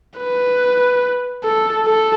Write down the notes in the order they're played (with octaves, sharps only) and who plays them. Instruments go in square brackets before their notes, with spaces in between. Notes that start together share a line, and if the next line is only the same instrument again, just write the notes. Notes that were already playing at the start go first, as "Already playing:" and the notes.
[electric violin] B4
A4
A4